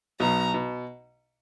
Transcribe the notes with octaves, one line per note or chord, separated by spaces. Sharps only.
B1 B2 A#5
B2